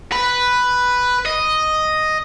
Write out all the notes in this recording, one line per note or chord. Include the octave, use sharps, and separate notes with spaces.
B4
D#5